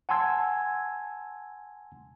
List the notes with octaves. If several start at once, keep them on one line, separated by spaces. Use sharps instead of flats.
F#5 G#5 A5 C6 E6 G#6